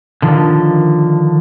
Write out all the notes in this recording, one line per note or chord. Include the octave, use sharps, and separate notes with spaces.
D3 D#3 F3